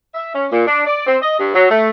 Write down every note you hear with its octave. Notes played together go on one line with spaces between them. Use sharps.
E5
C#4
A#2
D4
D5
C4
D#5
G2
F#3
A3